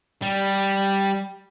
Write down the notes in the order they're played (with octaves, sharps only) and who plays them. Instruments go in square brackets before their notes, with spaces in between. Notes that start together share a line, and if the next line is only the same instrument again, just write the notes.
[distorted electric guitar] G3